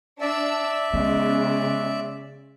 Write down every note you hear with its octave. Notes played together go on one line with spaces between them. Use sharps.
D4 D5 E5 E6
C#3 G#3 B3